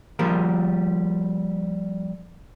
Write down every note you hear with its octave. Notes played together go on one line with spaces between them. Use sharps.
F3 G3 A#3 A#4